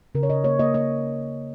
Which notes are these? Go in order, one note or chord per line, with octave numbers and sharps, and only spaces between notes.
C#3 A#4
C#5
C#3 D#5
A#3 C#5
A#3 D#5
A#3 D#5